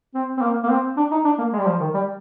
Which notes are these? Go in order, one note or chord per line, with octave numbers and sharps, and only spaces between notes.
C4
C4
A#3
A#3
C4
D4
D#4
D4
A#3
G#3
G3
F3
D#3
G3